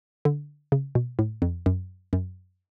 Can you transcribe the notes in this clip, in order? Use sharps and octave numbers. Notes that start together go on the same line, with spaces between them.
D3
C#3
B2
A2
F2
F#2
F#2